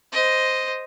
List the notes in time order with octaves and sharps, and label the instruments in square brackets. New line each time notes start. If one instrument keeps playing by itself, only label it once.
[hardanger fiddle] C5 D#5